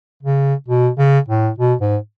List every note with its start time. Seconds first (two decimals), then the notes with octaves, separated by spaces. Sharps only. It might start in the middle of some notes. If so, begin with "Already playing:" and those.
0.23 C#3
0.68 B2
0.98 C#3
1.29 A2
1.58 B2
1.81 G#2